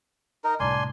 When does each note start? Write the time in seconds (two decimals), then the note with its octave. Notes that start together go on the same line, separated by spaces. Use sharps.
0.44 D#4 A#4
0.60 C2 A2 D4 G#5 C6